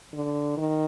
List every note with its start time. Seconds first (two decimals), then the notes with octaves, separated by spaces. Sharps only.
0.13 D3
0.57 D#3